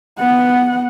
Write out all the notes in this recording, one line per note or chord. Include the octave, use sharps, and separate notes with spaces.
B3 F#5